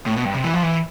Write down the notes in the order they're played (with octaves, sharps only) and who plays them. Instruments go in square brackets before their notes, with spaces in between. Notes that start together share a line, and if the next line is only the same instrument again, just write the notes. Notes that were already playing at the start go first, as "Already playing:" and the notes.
[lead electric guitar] A2
B2
G2
C3
E3
F3
E3